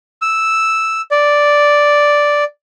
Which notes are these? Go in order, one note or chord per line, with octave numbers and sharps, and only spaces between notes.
E6
D5